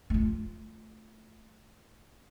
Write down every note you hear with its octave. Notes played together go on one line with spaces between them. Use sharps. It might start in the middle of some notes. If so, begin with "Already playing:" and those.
A3 F4